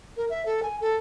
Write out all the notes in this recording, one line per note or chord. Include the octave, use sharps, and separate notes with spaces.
A#4
E5
A4
G#5
A4